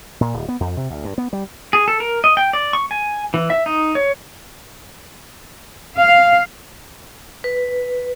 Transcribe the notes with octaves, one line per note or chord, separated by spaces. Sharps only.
A#2
D1
B3
F2
C3
D2
G2
B3
G3
G#4
A4
A#4
D#5
G5
D5
C#6
G#5
E3
E5
D#4
C#5
F5
B4